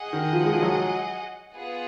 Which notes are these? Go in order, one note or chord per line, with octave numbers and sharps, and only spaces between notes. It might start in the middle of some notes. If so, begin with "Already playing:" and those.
Already playing: G#4 D#5 F#5
D#3
F3
G#3
F3
F#3
B3 F4 G#4 B4 F#5